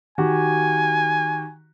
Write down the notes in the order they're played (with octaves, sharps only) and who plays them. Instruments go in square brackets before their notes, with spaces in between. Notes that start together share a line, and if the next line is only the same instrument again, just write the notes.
[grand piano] D#3 F#4 G4 [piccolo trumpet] G#5